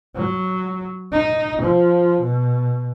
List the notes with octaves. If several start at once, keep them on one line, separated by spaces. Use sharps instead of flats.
F#3
D#4
F3
B2